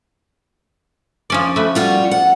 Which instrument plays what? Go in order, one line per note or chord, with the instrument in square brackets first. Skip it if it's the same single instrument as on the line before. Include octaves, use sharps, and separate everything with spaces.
[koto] F3 C#4 D5
A3 B4
[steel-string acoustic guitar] G3 F4 F#4
F#5